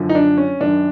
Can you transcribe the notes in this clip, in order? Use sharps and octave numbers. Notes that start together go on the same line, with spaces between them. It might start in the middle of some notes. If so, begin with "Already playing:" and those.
Already playing: F#2 D3 F3
D#4
D4
C#4
F#2 D#3 D4